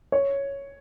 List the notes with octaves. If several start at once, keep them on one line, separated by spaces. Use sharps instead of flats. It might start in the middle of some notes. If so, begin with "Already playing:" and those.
C#5